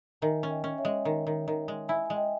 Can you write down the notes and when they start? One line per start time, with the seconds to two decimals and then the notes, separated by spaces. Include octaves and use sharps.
0.22 D#3 E5 G#5
0.43 C#4
0.50 D#5 G5
0.64 C#4
0.78 C#5 E5
0.85 G#3
1.05 D#3
1.27 D#3
1.48 D#3
1.68 G#3
1.88 E4 E5 G#5
2.06 G#3 G#5
2.16 D#5 G5